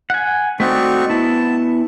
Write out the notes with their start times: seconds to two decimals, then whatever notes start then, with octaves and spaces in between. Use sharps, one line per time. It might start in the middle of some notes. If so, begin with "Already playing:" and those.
0.10 F#5 G#5
0.60 A3 C4 D#4 F#4 D5 C#6
1.10 B3 E4 A5